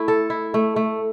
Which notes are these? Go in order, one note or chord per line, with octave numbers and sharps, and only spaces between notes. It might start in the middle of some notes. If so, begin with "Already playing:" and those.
Already playing: A3 E4
A4
E4
A3
A3